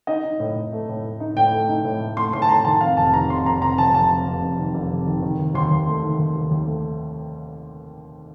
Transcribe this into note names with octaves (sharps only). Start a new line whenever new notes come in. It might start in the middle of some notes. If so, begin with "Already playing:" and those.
D#4 D#5
D#4
A2
A2
A3
A2
A3
D#4
A2 G5
A3
D#4
A2
A3
A3 C6
A2 C6
A5
A2 A#5
D#3 A5
F2 F5
F1 A5
D#3 A#5
F1 C6
F2 A#5
F1 A#5
F1 A5
F1 A5
F1
F1
F1
D#3
F1
F1
D#3
D#3
D#2
D#2 C6
D#2
A3
D#3
D#2
D#2
D#2
A3